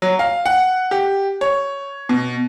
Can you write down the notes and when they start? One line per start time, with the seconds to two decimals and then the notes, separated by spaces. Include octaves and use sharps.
0.02 F#3
0.19 F5
0.46 F#5
0.91 G4
1.41 C#5
2.09 B2